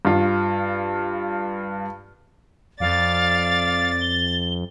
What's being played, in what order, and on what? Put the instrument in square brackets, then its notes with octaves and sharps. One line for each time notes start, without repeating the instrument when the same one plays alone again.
[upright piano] G2 F4
[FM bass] F2 [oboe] D5 [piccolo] F5 [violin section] A6
[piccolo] G7